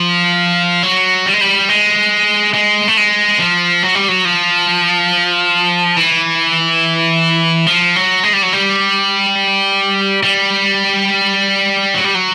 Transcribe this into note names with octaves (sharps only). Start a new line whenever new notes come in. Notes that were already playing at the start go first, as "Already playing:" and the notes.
Already playing: F3
F#3
G3
G#3
G3
G#3
G#3
A3
G#3
F3
F#3
G3
F#3
F3
E3
F3
F#3
G#3
G3
F#3
G3
G3
F#3
G3
F#3